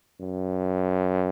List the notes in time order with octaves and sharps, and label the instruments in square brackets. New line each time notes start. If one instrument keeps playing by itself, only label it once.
[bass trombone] F#2